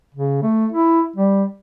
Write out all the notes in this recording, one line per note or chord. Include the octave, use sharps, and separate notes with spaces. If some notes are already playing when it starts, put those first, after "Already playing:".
C#3
A3
E4
G3